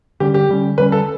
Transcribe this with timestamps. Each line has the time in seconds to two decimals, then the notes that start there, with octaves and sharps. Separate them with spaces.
0.20 D3 G3 C#4 G4
0.34 G4
0.49 D3 G3 C#4
0.78 D3 G3 C#4 B4
0.92 A4